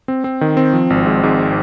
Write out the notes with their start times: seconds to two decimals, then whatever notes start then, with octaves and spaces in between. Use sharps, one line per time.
0.08 C4
0.24 C4
0.41 D#3
0.57 C4
0.73 F3
0.90 G#1
1.06 G#2
1.23 G#2